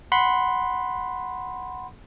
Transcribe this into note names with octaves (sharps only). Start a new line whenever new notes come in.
F#5 B5 C6